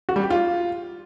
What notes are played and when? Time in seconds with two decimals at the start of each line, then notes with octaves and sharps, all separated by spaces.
0.09 F#4
0.16 G3
0.23 G4
0.30 F4